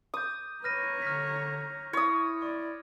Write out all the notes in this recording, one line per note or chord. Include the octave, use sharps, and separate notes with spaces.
D6 D#6 G6
B4 C#5 A#5 F6 A#6 D#7
D3 F6 A#6 B6
E4 C#5 D#6
D5 C#6